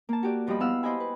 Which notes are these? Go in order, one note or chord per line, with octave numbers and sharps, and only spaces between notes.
A#3 A5
F#4 G4 D5
E2 F3 G3 G4 D#5 B5
B3 E4 F5 F#5 E6
E4 C5 D#5 G5 G#5 B5
B4